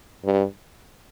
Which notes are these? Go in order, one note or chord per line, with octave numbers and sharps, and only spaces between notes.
G2